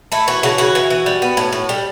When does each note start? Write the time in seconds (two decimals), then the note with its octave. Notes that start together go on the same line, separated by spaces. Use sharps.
0.12 A3 E4
0.28 E3 F#4
0.43 C#3 F#4
0.58 E3 F#4
0.75 E3
0.90 E3
1.06 G3
1.22 B3
1.37 A2
1.53 A2
1.69 G3